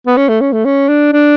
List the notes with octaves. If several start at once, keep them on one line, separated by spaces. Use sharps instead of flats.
B3
C#4
A3
C#4
A3
C#4
D4
D4